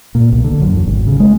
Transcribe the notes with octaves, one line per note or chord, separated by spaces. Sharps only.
A#2
B1
D3
F#2
E2
G#1
C#3
G#3